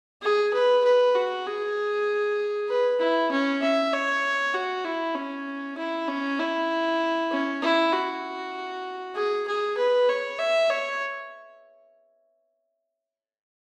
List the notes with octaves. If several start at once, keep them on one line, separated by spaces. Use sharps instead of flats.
G#4
B4
B4
F#4
G#4
B4
E4
C#4
E5
C#5
F#4
E4
C#4
E4
C#4
E4
C#4
E4
F#4
G#4
G#4
B4
C#5
E5
C#5